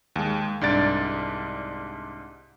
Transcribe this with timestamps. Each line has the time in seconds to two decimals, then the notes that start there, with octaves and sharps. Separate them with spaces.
0.16 D#2 G#3
0.61 C2 G#2 D4 D5 A6 D7